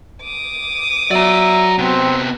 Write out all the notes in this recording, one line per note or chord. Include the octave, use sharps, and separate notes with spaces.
D6 D#6
F#3 D5 E5 A#5
C3 B3 C4